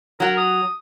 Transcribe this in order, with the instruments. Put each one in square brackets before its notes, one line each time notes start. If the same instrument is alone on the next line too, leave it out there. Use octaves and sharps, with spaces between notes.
[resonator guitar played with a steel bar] F#3 F#5 [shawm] A#4
[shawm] D#6